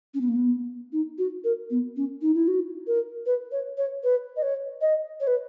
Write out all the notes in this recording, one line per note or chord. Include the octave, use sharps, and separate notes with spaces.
C#4
B3
A#3
B3
D#4
F#4
A#4
B3
C#4
D#4
E4
F#4
A#4
B4
C#5
C#5
B4
D#5
C#5
D#5
C#5
B4